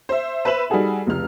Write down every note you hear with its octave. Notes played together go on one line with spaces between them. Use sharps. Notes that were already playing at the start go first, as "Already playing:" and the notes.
C5 E5
B4 C5 E5 E7 F#7
G3 D#4 F#4 G#4 A4
F1 C#2 F6